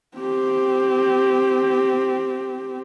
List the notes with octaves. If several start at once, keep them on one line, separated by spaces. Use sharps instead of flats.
C4 G4